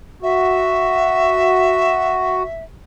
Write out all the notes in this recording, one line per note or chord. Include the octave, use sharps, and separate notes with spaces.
F#4 E5